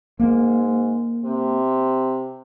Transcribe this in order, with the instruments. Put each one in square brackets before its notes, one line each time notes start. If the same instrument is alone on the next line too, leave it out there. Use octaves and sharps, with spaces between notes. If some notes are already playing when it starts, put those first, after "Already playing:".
[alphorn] G#2 [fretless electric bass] A#3
[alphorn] C3